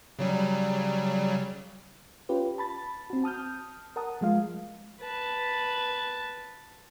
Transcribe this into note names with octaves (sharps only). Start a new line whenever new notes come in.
C#3 F#3 G3
C#4 F4 G4 B4
A5 B5 A6
C4 F#4
A5 D#6 F6 G6
A#4 F#5 A5 D#6
F3 G#3 F4 F5
B4 A5